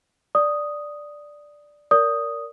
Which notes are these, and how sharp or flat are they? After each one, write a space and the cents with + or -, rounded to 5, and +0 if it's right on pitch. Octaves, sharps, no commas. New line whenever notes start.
D5 +0 D#6 +0
A#4 -5 D5 -30 D#6 +0